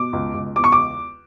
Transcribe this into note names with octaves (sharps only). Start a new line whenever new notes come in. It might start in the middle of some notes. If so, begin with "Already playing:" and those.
Already playing: B2 D6
C#2
C#2
E2 D6
C#6
D6